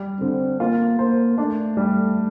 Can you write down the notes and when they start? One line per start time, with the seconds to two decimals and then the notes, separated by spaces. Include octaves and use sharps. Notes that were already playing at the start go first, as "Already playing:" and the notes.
Already playing: G3
0.20 D3 C4
0.60 A#3 F4
0.99 A#3 C5
1.38 A3 D4
1.77 G3